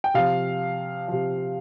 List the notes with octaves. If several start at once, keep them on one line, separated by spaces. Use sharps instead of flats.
G5
C3 F3 F5
C3 F3